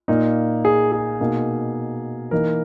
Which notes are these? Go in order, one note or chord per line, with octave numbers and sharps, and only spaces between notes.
A#2 A#3 D#4
G#4
G#4
B2 A#3 D#4
E3 A#3 D#4 A#4